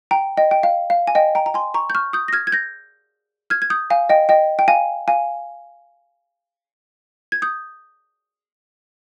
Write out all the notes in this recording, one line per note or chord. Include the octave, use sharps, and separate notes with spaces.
G5 A#5
D#5 G5
G5
F5
F5
G#5
D#5 G5
G5 A#5
A#5
G#5 C6
A#5 C#6
G6
C#6 F6
D#6 G6
A#6
F6 G#6
G#6
G6 A#6
F6 G#6
G#6
D#6 G6
F5 G#5
D#5 G5
D#5 G5
G5
F5 G#5
F5 G#5
G#6
D#6 G6